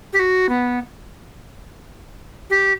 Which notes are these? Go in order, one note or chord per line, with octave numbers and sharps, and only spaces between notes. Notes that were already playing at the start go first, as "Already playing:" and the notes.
G4
F#4
B3
G4